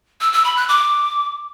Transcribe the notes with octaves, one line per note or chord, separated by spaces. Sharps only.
E6
E6
B5
F#6
D6